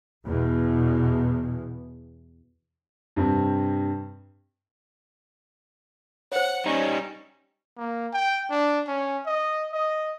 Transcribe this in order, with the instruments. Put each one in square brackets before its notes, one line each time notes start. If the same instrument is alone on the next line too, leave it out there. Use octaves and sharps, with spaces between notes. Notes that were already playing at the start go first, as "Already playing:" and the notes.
[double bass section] E2 B2
[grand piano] G2 C3 C4
[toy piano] C5 C#5 [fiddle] F#5
[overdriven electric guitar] G3 D#4 [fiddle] C#4
[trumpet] A#3
G5
D4
C#4
D#5
D#5